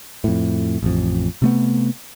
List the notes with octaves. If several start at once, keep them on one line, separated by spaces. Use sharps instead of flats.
F2 A2
A1 F2
C3 A3 B3